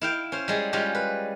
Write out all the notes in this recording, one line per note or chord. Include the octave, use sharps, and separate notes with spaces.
E4 F5 G5
C#4 C5
G3 G#3 G#4
G3 G#3 C#4 F4 G4
B4